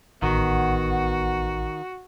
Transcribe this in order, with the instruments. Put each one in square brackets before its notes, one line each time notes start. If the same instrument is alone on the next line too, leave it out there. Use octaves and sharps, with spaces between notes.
[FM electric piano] A1 [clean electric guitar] D#3 [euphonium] B3 [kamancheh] F#4